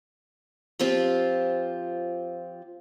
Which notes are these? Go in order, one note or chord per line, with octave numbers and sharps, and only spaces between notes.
F3 C4 F4 G4